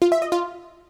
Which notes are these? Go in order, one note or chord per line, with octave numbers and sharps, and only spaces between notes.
F4
E5
D#5
F4